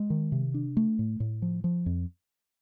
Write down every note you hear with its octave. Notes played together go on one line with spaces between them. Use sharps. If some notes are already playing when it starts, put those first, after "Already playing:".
Already playing: G#3
D#3
C3
D4
A3
A2
A2
F3
F3
F2